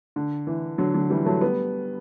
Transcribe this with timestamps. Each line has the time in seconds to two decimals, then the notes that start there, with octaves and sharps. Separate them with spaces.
0.16 D3
0.47 E3
0.78 D3 F#3
0.94 D3 F#3
1.10 E3 G3
1.26 F#3 A3
1.41 G3 B3